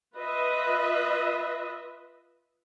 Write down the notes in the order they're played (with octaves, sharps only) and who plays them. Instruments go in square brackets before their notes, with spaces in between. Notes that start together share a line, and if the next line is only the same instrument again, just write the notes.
[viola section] F4 B4 D#5 E5